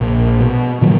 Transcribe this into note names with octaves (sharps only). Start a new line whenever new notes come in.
A#1
B2
A#2 D#3 F3 F#3